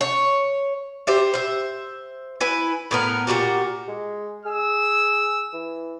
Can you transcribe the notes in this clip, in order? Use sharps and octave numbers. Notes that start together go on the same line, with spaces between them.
C#5
G4 C5 E5
C5 E5
E4 B4 G#5
A2 B3 A#4
A#2 E3 F#4 G4
G#3
G#4 E6
E3